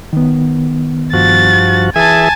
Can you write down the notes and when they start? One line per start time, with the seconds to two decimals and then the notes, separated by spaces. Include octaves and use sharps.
0.13 D#3 B3
1.13 G2 F3 F#4 A6
1.96 E3 G#4 E5 G#5 A5